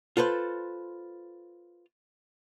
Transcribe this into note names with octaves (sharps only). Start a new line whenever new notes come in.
F4 A4 B4 C5